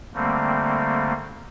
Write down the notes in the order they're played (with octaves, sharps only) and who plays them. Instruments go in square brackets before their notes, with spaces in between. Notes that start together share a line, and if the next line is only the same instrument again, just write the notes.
[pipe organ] D3 G3 A3 A#3 C4